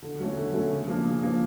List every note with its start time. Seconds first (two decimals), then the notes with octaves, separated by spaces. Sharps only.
0.02 D3
0.19 F#3 A3 C#4
0.37 D3
0.53 F#3 A3 C#4
0.71 C#3
0.87 F3 A#3 D4
1.05 C#3
1.21 F3 A#3 D4